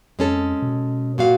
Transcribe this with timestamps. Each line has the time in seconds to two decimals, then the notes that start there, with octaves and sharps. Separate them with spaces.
0.19 F2 G#3 C#4 A4
0.62 B2
1.18 A#2 F#4 F5